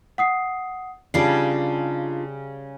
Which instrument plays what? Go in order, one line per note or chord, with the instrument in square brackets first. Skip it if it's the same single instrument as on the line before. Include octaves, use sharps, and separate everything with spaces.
[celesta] F#5 D#6 C7
[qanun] C#3 G3 D5 [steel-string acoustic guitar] D4 D#4 F4 [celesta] A5 C7